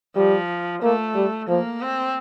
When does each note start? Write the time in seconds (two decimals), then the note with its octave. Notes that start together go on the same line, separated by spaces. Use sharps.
0.15 F3 G3
0.82 A3 A#3
1.15 G3
1.48 F3 A#3
1.81 C4